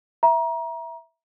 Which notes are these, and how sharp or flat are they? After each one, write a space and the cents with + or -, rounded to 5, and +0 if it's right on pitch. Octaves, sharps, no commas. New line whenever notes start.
E5 +0 A#5 +25